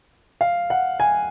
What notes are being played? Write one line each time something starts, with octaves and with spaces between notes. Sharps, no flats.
F5
F#5
G#5